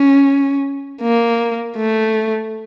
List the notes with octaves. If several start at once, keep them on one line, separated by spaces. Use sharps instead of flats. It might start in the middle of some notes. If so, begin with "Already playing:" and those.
Already playing: C#4
A#3
A3